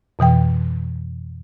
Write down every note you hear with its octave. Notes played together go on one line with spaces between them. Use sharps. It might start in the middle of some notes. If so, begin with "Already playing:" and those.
F2 B2 E3 G5